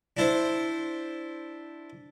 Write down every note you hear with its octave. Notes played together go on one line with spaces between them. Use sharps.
D4 E4 C5